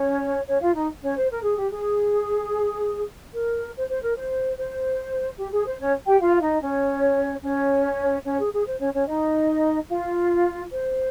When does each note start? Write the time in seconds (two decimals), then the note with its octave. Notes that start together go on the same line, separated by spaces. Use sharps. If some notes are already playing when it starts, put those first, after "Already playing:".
Already playing: C#4 C#5
0.48 C#4 C#5
0.62 F4 F5
0.75 D#4 D#5
1.03 C#4 C#5
1.16 C5
1.30 A#4
1.43 G#4
1.58 G4
1.71 G#4
3.34 A#4
3.75 C5
3.89 C5
4.02 A#4
4.16 C5
4.57 C5
5.38 G4
5.52 G#4
5.66 C5
5.80 C#4 C#5
6.06 G4 G5
6.20 F4 F5
6.35 F5
6.41 D#4 D#5
6.62 C#4 C#5
7.43 C#4 C#5
8.25 C#4 C#5
8.39 G#4
8.53 G#4
8.66 C5
8.79 C#4 C#5
8.94 C#4 C#5
9.07 D#4 D#5
9.89 F4 F5
10.71 C5